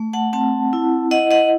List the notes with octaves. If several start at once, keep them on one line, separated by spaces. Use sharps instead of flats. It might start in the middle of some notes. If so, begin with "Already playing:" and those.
Already playing: A3
F#5 A5
C4 F#5 A5
E4
E4 D#5 F#5
D#5 F#5